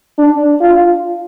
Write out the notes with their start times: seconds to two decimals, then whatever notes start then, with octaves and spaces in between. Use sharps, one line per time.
0.18 D4
0.61 F4